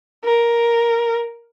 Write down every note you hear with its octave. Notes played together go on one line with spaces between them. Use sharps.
A#4